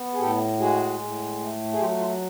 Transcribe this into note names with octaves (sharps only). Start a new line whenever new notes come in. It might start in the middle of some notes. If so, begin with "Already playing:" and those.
Already playing: B3
G#4
A2 G4 A4
G#3 F#4 G#4
A2
A3
G#4
F#3 F4 G4
F4